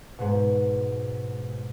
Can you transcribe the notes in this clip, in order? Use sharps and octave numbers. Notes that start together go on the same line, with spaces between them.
G#2 B2